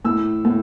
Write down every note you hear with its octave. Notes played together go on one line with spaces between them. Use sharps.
A2 E6
A2